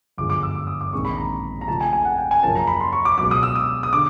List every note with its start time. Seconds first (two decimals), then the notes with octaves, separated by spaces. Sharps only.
0.18 G1 F#2 D3 F3 G#3 D6
0.30 D6
0.43 E6
0.55 D6
0.67 D#6
0.81 D6
0.93 A#1 G#2 D#3 G#3 C4 C#6
1.05 B5
1.17 A#5
1.61 A#5
1.68 F2 C#3 F3 A3 A5
1.81 G#5
1.93 G#5
2.05 F#5
2.18 G5
2.31 G#5
2.43 F#2 C#3 F3 A#3 C#4 A5
2.55 A#5
2.67 B5
2.81 C6
2.93 C#6
3.05 D6
3.18 C#2 B2 F#3 D6
3.31 D#6
3.43 E6
3.55 D#6
3.83 D#6
3.93 D3 D6